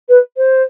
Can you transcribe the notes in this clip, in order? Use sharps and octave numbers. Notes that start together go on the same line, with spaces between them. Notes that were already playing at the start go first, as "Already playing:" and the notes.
B4
C5